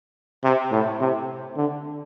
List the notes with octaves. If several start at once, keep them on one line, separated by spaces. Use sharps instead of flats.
C3
A2
C3
D3